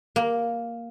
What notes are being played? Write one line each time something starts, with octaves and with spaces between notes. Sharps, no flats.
A#3